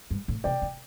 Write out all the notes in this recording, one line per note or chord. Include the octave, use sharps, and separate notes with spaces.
G2
A2
C3 D5 G5
D3